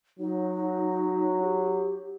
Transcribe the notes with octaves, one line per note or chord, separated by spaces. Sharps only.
F#3 D#4
G4